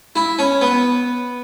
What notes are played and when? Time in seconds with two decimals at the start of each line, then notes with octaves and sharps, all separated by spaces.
0.16 E4
0.39 C#4
0.61 B3